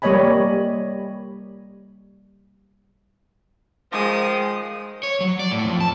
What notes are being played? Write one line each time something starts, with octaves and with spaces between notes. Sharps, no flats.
G3 A#3 C#5 D#5 G#5 B5
D#3 F3 G#3 D#6
C#5
F#3
D5
A2
F2
A5